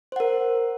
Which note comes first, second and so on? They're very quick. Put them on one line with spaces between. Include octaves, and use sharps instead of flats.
C5 F#5 A#4